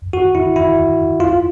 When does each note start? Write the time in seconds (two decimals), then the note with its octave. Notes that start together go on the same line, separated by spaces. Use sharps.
0.13 F#4
0.35 E4
0.56 E4
1.20 F4